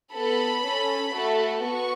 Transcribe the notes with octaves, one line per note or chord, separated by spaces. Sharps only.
B3 A4 B5
C#4 A4
A3 F#4 A4
B3 F#4 C#6